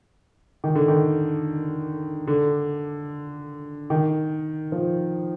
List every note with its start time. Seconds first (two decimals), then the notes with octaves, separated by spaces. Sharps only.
0.64 D#3
0.75 D3
0.88 D#3
2.28 D3
3.90 D#3
4.72 F3